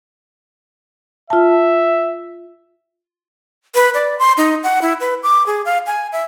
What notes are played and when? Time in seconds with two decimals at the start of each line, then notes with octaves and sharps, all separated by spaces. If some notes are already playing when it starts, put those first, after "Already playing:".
1.30 F4 E5 A5
3.75 B4
3.94 D5
4.19 C6
4.37 D#4
4.63 F#5
4.82 E4
5.00 B4
5.23 D6
5.46 G#4
5.65 F5
5.86 G#5
6.12 E5